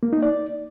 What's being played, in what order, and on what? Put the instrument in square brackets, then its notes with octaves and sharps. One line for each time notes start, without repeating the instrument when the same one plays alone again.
[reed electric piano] A#3
D#4
D5